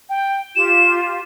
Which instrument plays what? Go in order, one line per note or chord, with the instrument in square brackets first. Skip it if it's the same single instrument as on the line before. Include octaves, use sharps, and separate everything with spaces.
[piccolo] G5
[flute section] F4 G4 [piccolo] E7